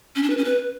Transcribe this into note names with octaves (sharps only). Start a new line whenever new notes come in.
C#4
D4
B4
C#4
B4